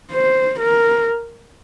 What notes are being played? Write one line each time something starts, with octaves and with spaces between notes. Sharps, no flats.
C5
A#4